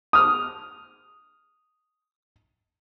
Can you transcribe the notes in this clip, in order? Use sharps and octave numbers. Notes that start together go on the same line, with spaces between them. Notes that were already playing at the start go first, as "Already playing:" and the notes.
D#6 F6